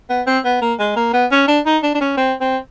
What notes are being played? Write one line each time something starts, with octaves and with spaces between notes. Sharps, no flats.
B3
C4
B3
A#3
G#3
A#3
B3
C#4
D4
D#4
D4
D4
C#4
C4
C4